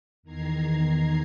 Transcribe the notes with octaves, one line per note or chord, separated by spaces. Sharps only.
E2 D#3 A#5 G#6 C7